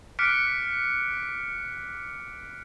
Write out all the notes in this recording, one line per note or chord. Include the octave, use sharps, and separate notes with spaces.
D6 F6 F#6 B6 C#7 D7